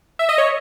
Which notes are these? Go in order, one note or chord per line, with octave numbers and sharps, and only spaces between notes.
E5
D#5
C#5